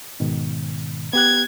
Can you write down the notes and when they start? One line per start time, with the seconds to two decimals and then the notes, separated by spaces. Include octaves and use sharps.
0.20 G#2 B2 D#3
1.13 B3 G4 F#6 G#6